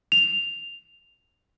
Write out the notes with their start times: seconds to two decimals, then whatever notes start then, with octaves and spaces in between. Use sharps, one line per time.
0.12 F7